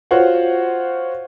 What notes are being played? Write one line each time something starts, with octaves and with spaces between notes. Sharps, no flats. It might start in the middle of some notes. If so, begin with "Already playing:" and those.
F4 F#4 C5 C#5 F#5